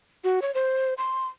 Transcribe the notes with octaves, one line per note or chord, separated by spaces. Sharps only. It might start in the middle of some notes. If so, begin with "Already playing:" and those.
F#4
C#5
C5
C6